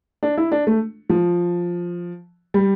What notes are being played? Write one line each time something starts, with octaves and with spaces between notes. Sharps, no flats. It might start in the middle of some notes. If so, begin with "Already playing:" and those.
D4
E4
D4
A3
F3
G3